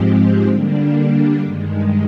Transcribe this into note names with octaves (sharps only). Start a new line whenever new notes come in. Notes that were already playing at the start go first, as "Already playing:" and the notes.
Already playing: G#2 F3 G#3 C4 G4
D3 G3 A#3 D4
G2 D#3 G#3